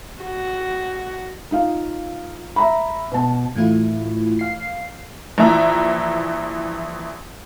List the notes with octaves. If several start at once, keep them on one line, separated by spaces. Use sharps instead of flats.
F#4
D#4 F4 F5
E5 A#5 B5
B2 A5
A2 E3 A3 E4 F4
F5 C7
A#1 E3 E5 A#5